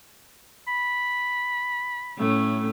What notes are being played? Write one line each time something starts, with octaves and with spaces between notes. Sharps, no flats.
B5
A2 A3 C#4